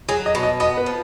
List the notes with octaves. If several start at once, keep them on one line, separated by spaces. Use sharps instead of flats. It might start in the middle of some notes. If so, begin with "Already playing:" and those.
F#3 G#4
D#5
B2
D#5
B3 D#5
B4
F3